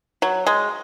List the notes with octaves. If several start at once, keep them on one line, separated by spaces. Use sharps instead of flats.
F#3
G#3